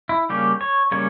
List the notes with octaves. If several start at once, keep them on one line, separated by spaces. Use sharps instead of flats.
E4
C#3 G3 A#3 C#4 G4
C#5
C#3 G3 A#3 C#4 C#5